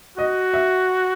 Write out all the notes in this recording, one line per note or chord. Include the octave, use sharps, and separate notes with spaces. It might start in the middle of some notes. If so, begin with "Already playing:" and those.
F#4 D#5
E5